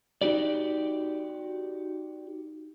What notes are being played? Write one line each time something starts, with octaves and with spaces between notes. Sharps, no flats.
D#4 F#4 G4 D5